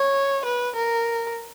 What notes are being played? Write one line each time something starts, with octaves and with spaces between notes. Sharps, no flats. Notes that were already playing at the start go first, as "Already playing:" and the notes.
Already playing: C#5
B4
A#4